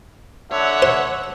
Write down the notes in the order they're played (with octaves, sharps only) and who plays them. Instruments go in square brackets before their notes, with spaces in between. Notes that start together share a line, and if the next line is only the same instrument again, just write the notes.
[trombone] D3 [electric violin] C#5 F#5 [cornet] E5
[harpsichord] C5